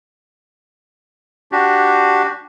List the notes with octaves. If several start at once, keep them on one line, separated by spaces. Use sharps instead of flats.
D4 F#4 G4